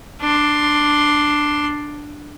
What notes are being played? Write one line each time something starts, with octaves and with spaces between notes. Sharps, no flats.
D4 C6